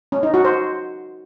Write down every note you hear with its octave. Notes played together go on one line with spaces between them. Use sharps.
C#4
D#4
F#4
C5